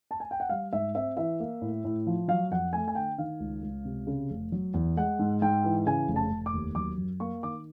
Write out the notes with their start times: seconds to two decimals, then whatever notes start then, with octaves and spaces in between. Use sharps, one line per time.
0.11 A5
0.20 G#5
0.31 G5
0.40 F#5
0.49 G3 F5
0.73 G#2 E5
0.95 C4 E5
1.17 E3 E5
1.40 A#3
1.62 A2
1.85 A2
2.07 F3
2.28 F#3 F5
2.51 F2 F#5
2.73 A3 G#5
2.88 G#5
2.95 D3 G5
3.18 D#3 F5
3.40 C#2
3.63 C#2
3.85 C3
4.07 C#3
4.30 F1
4.52 F#3
4.74 E2
4.97 G#3 F#5
5.19 G#2
5.42 G#2 G5
5.64 E3
5.86 C#3 G#5
6.08 F1
6.16 A5
6.31 F1
6.46 D6
6.53 D#2
6.75 F#3 D6
6.98 F#2
7.20 A#3 C#6
7.43 D#3 D6